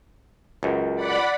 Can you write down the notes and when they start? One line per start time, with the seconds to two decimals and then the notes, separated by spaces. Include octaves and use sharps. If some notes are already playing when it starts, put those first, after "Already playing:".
0.63 C#2 F#2
0.95 D5 F#5 B5